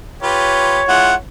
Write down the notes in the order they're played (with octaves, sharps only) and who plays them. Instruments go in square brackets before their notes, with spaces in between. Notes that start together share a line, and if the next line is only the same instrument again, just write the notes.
[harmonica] F4 G4 B4 [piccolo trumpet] C#5
[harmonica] G#3 E4 F4 [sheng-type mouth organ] F#5